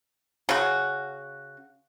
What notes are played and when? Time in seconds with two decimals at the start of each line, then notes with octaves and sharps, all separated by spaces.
0.49 C#3 F#4